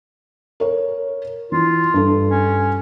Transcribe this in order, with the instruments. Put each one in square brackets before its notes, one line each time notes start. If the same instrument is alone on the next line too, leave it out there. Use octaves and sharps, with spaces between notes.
[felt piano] A#4 C#5
[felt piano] E3 [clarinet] F4
[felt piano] G2 A4
[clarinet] C#4